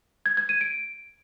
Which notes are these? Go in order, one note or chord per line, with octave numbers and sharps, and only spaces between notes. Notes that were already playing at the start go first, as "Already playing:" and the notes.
G#6
G#6
D#7
D7